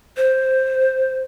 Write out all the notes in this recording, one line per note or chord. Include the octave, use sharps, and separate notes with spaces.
C5